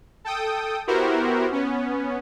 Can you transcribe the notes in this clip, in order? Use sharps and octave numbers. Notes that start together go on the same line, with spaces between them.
A4 G5 D#6
B3 E4 F#4 G4 A#4 C5
B3 C#4